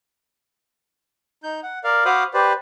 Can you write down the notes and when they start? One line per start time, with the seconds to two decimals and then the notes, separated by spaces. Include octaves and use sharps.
1.43 D#4 G6
1.63 F#5
1.84 A#4 D5 F5
2.05 F#4 C5 F5 B5 D6 D#6
2.34 G4 B4 C5 D5